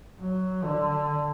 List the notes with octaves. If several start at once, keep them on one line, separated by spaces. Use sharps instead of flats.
F#3
D3